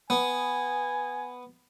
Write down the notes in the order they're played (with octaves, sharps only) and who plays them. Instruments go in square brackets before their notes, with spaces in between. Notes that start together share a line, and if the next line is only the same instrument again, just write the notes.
[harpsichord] B3 [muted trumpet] G#5